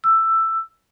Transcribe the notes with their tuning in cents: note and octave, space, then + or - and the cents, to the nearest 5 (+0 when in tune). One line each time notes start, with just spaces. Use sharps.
E6 +10